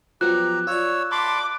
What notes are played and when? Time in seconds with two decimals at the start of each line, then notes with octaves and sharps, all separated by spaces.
0.21 F3 F#3 B3 G4 A#5 F#6
0.67 F4 C#5 D5 E6
1.12 A5 B5 C6 D6